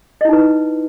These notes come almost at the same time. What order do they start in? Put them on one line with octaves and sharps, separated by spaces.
D#5 E4 D#4 B4